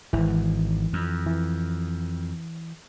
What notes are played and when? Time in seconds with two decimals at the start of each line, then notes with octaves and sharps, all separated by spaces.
0.13 G#1 E3
0.93 F2
1.26 E3